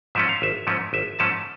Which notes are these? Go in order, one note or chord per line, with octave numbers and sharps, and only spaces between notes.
G#2 F3 A3 C#4 E5
F5
G#1 E5
G#2 F3 A3 C#4
G#1 E5
G#2 F3 A3 C#4 A5